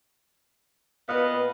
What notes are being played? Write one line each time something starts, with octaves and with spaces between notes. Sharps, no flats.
A#2 B3 B4 D#5 F5